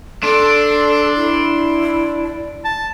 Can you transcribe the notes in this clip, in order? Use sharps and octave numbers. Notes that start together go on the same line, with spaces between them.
D4 A4 C6
E4
A5